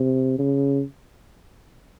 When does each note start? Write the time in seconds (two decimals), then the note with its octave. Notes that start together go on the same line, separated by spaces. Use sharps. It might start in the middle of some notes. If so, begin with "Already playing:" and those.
Already playing: C3
0.39 C#3